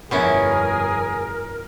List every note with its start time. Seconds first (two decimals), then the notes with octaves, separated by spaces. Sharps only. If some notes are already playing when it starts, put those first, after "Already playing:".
0.11 G1 F2 B2 C#4 E4 G#4 A#4